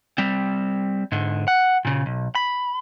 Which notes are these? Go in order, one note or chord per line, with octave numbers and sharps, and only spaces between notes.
G3 C4
G#2 D3
F#5
A#2 C#3
B1
B5